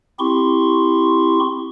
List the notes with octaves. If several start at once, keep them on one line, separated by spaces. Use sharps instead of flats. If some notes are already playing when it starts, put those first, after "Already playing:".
C4 E4 G4 C6 C#6